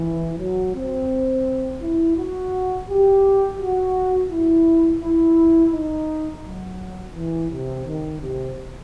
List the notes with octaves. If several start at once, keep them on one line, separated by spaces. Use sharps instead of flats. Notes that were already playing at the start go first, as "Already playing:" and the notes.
Already playing: E3
F#3
C4
E4
F#4
G4
F#4
E4
E4
D#4
F#3
E3
C3
D#3
C3